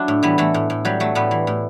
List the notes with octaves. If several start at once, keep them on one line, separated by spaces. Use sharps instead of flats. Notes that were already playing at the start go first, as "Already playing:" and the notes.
Already playing: F#3 D4 E4
A2
E3 G3 B3
E3 A3
A2
A2
F#3 G3
F#3 A3
A2 G3 B3
E3
A2